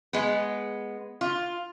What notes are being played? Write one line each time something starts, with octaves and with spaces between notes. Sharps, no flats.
G#3 B3
F4